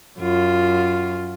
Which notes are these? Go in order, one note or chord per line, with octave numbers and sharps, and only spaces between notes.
F#2 F4